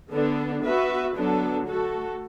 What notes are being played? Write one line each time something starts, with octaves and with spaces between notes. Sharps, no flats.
D3 B3 D4 A4
B3 F#4 B4 E5
D3 F#3 B3 D4 A4
A3 F#4 A4